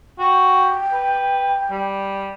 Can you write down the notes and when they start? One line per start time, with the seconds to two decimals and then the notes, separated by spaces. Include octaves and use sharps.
0.19 F#4 G5
0.93 B4
1.70 G3